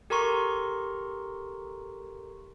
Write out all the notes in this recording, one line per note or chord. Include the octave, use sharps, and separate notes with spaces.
G4 A4 A#4 A#5 C6 C#6